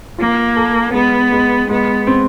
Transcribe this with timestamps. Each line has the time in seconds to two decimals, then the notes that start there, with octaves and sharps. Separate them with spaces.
0.18 A#3 F4
0.56 A4
0.94 G#3 B3
1.32 G#3
1.69 G#3 B3
2.07 C4